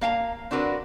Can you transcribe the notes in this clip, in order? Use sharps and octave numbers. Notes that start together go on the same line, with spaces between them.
A#3 F5 G5 A#5
C4 D4 F#4 A#4 B4